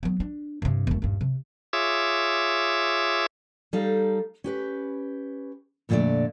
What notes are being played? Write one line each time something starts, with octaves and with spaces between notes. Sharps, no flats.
F#3 B3
D4
G2 C3
E1 A3
D#1 G2
C3
F4 G#4 C#5 E5 D6 E6
G3 D#4 A4 F5
C#4 G4 B4
F2 A#2 D3 D#3 A3 D5